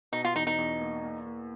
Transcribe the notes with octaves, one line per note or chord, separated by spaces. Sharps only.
B2 D#4
F4
E2 D#4
D#4
E2
A#3
A#3
A#3